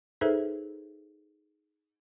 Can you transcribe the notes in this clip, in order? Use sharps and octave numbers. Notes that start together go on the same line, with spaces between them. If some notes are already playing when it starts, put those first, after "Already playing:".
D#4 G#4 A4 B4 C5 E5